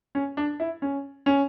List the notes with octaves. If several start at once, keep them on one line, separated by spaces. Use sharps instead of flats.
C#4
D4
E4
C#4
C#4